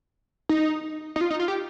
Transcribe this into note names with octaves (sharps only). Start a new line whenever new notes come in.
D#4
D#4
F4
D#4
F4
G4